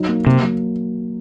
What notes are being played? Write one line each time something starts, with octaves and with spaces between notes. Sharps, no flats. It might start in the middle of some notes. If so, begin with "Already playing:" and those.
Already playing: F#3 D#4
A#3
C3 A#3
F#3